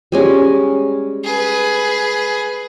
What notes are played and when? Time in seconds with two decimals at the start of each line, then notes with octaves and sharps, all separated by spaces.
0.12 G3 G#3 C#4
1.24 G#4 B4